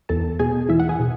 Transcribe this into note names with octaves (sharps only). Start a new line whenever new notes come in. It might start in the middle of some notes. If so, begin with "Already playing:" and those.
E2 A4 A5
B2 G#4 G#5
E2 E4 E5
F#5
G#4 G#5
B2